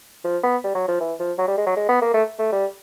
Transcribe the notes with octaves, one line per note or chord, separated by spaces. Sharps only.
F3
B3
G3
F#3
F3
E3
F3
F#3
G3
G#3
F#3
G#3
B3
A#3
A3
A3
G3